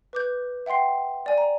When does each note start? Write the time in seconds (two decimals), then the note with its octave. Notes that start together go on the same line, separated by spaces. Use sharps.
0.13 B4 D6 G6
0.66 E5 F#5 G5 C6 C7
1.26 D5 G#5
1.38 A#5